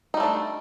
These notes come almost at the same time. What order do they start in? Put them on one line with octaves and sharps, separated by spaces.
D#4 G3 A3 D4